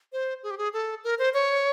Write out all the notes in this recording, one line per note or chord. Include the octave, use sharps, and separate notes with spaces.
C5
G#4
G4
G#4
A4
A#4
C5
C#5